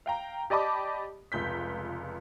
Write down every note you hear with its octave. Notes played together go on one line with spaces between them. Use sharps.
F5 G5 A#5
G4 D5 D#5 A5 B5 D6
F1 C#2 G6 B6